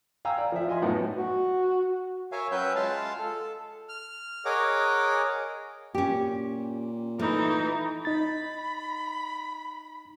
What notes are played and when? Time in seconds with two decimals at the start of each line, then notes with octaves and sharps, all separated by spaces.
0.25 F5 G5 G#5 A#5 E6
0.38 D5
0.52 F3 E5
0.68 F4 D#5 G#5 C6
0.81 F#2 A2 B3 D#4
1.16 F#4
2.32 A#4 C#5 E5 F5 G#5
2.52 F#3 C#4 B4 E5 G5 G6
2.76 G#3 F4 F5 A5
3.19 A4
3.89 F6
4.45 G#4 A#4 C#5 D#5 F#5 D6
5.95 A#2 C#4 G4
7.19 E3 A3 D#4
8.05 D#4 B5 A6